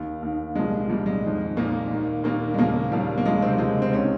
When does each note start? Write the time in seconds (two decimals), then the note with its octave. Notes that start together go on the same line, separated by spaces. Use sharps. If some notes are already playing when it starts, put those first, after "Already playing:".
Already playing: D#2 D#3
0.22 D#2 D#3
0.55 C2 A#2 F3 G#3
0.89 C2 A#2 F3 G3
1.06 G#3
1.24 F2 D#3
1.56 F2 A#2 D#3 A#3
1.90 D#2 D#3
2.24 D#2 A#2 D#3 A#3
2.54 G#3
2.58 D#2 A#2 C#3 F3 A#3
2.92 D#2 C#3 F3 G3
3.18 A#3
3.25 D#2 C#3 F3 G#3
3.42 C3 C4
3.58 D#2 C#3 F3 G#3
3.82 C4
3.92 C#2 C3 D#3 C#4